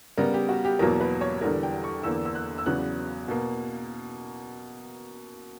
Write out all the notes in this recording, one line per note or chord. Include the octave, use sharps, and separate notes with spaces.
C#3 G3 B3 A#4
G4
F#4
G4
E2 B2 F#3 A#3 A#4
B4
C#5
E2 D3 G3 A#4
G5
C#6
E2 D3 A#3 E6
E6
F#6
E6
E2 C#3 F#3 B3 F#6
B2 A#3